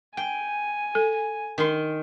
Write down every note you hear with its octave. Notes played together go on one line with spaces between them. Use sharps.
G5 G#5
A4
D#3 C6